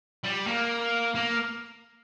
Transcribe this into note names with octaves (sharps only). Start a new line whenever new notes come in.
G3
A#3
A#3